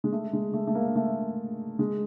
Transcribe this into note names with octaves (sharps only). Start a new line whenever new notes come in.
G#3
A3
G#3
A3
A3
A#3
A3
G#3